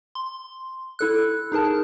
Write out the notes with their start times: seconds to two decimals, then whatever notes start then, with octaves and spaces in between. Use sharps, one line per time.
0.15 C6
0.99 E4 A4 F#6
1.52 D#4 G#4 A#4 A5